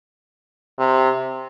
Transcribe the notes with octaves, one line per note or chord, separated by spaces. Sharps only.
C3